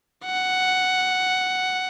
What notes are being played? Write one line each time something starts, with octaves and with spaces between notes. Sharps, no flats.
F#5